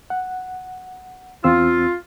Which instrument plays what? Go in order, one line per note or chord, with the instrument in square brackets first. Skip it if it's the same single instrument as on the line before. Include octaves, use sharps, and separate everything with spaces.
[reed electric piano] F#5
[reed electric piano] E2 C4 E6 [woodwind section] F4